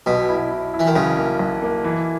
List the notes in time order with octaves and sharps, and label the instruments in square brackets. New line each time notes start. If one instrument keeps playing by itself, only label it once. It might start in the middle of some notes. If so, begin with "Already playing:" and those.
[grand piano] B1 [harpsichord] B2
[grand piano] E4
E4
E4
[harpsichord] E3
D#3
[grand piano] B1 [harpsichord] C#3
[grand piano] A#3
B1
A#3
E3